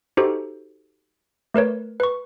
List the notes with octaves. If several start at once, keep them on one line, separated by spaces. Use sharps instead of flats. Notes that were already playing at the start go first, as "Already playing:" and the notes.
D#4 F#4 G4 A4 C5
A3 A#4 B4 C#5
B4 C#6